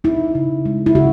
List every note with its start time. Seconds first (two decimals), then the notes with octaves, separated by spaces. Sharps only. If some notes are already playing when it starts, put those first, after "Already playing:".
0.04 D#4 E4
0.35 C#3
0.66 G#3
0.86 E4
0.95 C#3 F#4